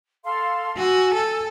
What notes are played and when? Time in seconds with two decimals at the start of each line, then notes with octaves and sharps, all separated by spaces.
0.24 A4 F5 C6
0.77 F#4 G#5 E6
1.14 A4